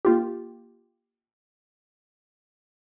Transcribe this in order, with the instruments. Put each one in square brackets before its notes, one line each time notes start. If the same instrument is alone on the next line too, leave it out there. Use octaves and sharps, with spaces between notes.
[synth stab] A#3 F4 G4